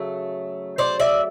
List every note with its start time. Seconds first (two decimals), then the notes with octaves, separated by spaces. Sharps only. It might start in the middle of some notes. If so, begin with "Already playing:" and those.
Already playing: C#3 F#3 A3
0.78 C5 D5
1.00 D5 E5